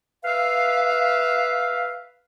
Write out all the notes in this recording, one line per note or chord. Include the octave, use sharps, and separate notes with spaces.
B4 E5 F5